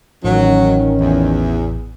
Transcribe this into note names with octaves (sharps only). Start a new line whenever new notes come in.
A1 D#3 F#3 C#4
E2